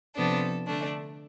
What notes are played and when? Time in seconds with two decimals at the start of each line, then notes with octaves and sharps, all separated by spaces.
0.16 C3 F3 B3 D4 A4
0.67 D3 A3 D4